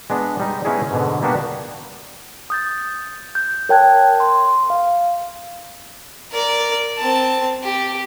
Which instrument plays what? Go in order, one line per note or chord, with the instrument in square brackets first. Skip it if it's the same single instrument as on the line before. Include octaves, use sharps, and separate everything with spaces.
[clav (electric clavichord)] G#3 B3 D4
G3 D#4
G#3 B3 C#4 D#4 E4 G#4
G#2 B2 D3
G3 A#3 B3 D4 F#4 G4
[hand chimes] D#6 G6 A6
G6
A#4 C#5 G5 A5 F#6 G#6
C6
F5
[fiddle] A#4 D5
C4 A5
G4